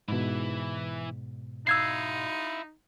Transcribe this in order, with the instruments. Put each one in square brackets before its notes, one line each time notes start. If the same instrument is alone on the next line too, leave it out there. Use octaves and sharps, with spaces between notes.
[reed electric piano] G#2 B2 [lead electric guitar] E3 E4
[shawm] D#4 [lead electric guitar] E4 F5 [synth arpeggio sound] E6 G#6 C7